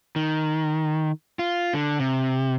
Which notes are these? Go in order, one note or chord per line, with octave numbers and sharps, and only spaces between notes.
D#3
F4
D3
C3